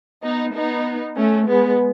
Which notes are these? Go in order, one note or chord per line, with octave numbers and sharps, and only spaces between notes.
B3 D#4
B3 D#4
A3 C#4
G#3 B3